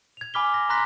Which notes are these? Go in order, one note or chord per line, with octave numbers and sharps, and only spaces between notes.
G#6 F7
G#5 B5 D6 F6 B6 G7
A#6
A#5 C6 F#6 A#6 B6